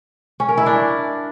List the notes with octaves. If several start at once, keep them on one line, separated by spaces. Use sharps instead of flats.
C#4
A#4
E4
D4